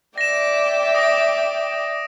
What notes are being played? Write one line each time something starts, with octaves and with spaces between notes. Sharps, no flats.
D5 E5 G5 A#6 E7
D#6 A#6 D7